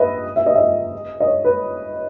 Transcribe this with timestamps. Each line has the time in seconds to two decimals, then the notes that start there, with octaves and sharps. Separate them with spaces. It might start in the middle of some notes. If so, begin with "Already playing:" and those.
Already playing: B4 D#5 E5
0.36 E5
0.46 D#5
0.54 E5
0.58 D#5
1.20 D#5
1.27 C#5
1.44 B4